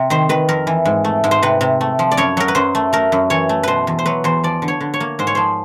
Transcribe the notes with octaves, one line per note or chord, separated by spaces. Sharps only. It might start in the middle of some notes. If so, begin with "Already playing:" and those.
Already playing: C3
D#3 C5
D#3 B4
F2 A#4
E3
G#2
A3
G#2
C5
C3 B4
C3
A3
F3
D5
F#2 C#5
F#3 A#4
B4
F#2 C5
A3
A3 A#4
F#2
E3 C#5
A3
B2 B4 C5
E2
C5
F#3 B4
E2 C5
F3 D5
D3
C#5
D3
C#5
A#3
G#2 C5
C#5
F3 C5